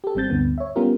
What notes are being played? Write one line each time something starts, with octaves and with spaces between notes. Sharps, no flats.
G4 A4
G#1 G3 C4 G6 A6
D2 G2 D3 B3
C#5 E5
G3 B3 C#4 F4 G4 A#4